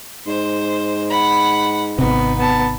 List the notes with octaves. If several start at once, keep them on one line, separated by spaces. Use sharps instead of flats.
G#2 C5
F#5 B5
G#1 C3 B3 D#4
B3 A5